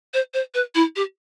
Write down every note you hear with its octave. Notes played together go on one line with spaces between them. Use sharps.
C5
C5
B4
E4
G4